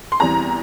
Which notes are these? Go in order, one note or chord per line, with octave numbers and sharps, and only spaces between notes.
C6
E2 E3 G3 C4 A#5